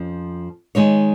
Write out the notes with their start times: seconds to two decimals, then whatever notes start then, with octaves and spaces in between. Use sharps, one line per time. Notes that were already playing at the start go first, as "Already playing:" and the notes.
Already playing: F2 F3 C#4
0.75 D#3 G#3 D#4 C#5